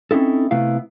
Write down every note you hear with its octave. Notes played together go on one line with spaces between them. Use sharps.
C4 C#4 D#4 E4 A4
C3 A3 B3 E4 F5